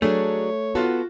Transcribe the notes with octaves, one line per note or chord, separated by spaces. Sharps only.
F#3 A3 D4 G#4 C#5
B3 F4 F#4 A4